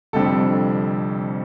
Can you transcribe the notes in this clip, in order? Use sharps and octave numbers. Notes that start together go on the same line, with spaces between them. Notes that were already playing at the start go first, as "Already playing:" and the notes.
F1 F2 D3 G3 C4 A4